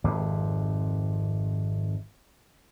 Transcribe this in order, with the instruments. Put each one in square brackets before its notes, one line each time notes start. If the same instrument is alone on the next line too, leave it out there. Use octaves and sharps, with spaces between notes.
[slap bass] G#1 F2 C3